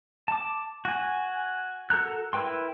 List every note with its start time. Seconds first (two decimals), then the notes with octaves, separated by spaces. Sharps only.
0.28 A5 D6
0.85 F#4 G#5
1.90 F#4 A4 A#4 A#5 F#6
2.33 E4 A#4 B4 G5 C6